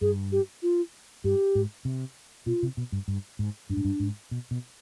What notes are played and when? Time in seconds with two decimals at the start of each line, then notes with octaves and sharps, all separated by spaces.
0.01 G2 G#4
0.32 G4
0.63 F4
1.24 G2 G4
1.55 G#2
1.85 C3
2.46 B2 F4
2.63 C3
2.77 B2
2.92 G2
3.08 G2
3.39 G#2
3.70 G2 D4
3.77 G#2
3.85 G2
4.00 G#2
4.31 B2
4.51 B2